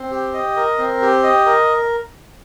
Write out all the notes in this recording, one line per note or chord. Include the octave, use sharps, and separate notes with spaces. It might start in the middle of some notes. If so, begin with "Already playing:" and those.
Already playing: C4
G4
D#5
A#4
C4
G4
D#5
A#4